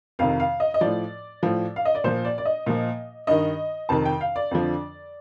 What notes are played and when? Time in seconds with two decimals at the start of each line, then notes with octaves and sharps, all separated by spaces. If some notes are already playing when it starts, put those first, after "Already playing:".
0.19 F2 C3 D#3 F5
0.40 F5
0.60 D#5
0.74 D#5
0.81 A2 F3 D5
1.43 A2 F3
1.76 F5
1.85 D#5
1.95 D5
2.04 A#2 F3 C5
2.25 D5
2.38 D5
2.45 D#5
2.66 A#2 F3
3.27 G2 D#3 D#5
3.89 F2 C3 D#3 A5
4.05 G5
4.21 F5
4.36 D5
4.51 F2 D3 F3